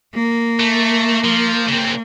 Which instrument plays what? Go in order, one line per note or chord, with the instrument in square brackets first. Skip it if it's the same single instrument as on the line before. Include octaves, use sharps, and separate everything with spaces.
[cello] A#3
[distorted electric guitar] A3
F3
C#3 C4